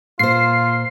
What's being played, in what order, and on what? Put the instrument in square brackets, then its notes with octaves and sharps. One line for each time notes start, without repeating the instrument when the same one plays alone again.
[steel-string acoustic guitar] A#2 C5 [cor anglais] F4 [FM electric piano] C7